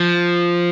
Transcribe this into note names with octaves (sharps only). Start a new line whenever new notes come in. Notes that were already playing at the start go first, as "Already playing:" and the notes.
Already playing: F3